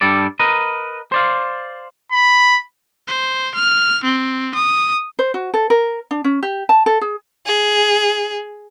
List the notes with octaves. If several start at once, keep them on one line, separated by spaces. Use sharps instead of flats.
G2 G3 A4 D5
A#4 B4 D#5
C5 D5 F5
B5
C5
F6
C4
D#6
C5
F#4
A4
A#4
D4
C#4
G4
A5
A4
G#4
G#4